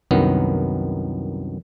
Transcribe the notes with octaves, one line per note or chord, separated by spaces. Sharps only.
C2 F#2 D#3 B3